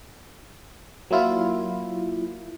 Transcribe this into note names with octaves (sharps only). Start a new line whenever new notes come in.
F#3 A#3 E4 F4